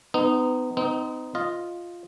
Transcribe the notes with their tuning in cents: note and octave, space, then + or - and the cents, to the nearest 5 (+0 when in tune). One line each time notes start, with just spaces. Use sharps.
B3 +35 D#4 -15
C4 -45 D#4 +0
F4 +0 D#5 +0